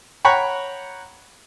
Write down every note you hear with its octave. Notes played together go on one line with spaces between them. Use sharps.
C#5 F#5 G5 A#5 B5 C#6